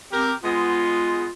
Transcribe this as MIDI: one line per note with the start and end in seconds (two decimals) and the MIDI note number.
0.12 0.33 60
0.12 0.33 67
0.12 0.33 70
0.44 1.26 56
0.44 1.26 59
0.44 1.31 65